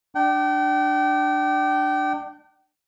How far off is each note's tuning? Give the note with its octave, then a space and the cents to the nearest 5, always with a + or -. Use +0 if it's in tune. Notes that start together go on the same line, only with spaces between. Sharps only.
D4 +15 G5 -35